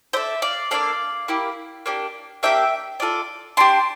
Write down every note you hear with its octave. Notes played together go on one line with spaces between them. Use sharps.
D4 A4 C5 E5
D5 F5
A#3 D4 A4 D5 F5
A#3 E4 G4
A#3 D4 G4
A#3 D4 G4 E5 G5
D4 F4 A4
D4 G4 A5 C6